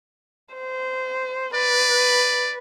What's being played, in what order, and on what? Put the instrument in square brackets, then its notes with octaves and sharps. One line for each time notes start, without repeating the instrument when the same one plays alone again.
[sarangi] C5
[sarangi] B4 [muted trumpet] D5